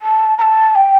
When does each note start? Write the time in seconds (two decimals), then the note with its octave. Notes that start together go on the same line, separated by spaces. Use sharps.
0.02 A5
0.38 A#5
0.42 A5
0.75 G5